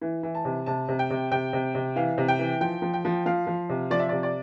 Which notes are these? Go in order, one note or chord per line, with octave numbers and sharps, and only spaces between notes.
E3
E3
A5
C3
C3 A5
C3
G5
C3
C3 G5
C3
C3
E3 F5
C3
G5
E3
F3 G5
F3
G5
F3
F3 F5
F3
C3
F3 D5
E5
C3 D5
D5